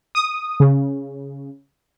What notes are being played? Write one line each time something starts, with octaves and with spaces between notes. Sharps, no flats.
D#6
C#3